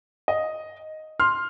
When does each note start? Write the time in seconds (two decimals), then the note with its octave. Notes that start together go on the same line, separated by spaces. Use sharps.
0.28 D#5
1.19 C6 F6